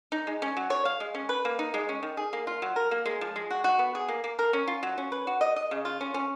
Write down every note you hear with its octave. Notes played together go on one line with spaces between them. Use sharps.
D#4
G#3
C#4
F#3
C#5
F5
G#3
C#4
B4
A#3
D#4
G#3
C#4
D#3
G#4
A#3
F4
F#3
A#4
A#3
G#3
F3
G#3
F#4
F#4
B3
G#4
A#3
A#3
A#4
C#4
F4
F#3
C#4
B4
F#4
D#5
D#5
C#3
F4
C#4
C#4